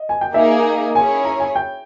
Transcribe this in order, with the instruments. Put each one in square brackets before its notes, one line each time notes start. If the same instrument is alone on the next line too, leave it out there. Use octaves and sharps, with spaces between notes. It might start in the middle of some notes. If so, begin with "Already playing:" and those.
Already playing: [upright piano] D#5
G#5
G5
[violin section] A#3 D#4 G#4 [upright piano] E5
[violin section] C#4 E4 G#4 C#5 [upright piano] G#5
[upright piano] A#5
G#5
G5